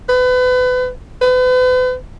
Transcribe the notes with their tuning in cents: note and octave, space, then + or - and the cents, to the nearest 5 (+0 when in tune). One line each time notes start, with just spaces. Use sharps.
B4 +30
B4 +40